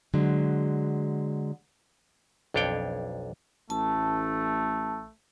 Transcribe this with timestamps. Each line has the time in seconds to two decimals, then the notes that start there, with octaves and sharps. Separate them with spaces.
0.14 D3 F#3 G#3
2.54 B1 F2 D4 C#5 G5
3.70 A1 A3 A5